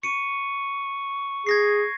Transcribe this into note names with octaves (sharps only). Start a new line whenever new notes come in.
C#6 C#7 D#7
G#4 G#6 A#6 C7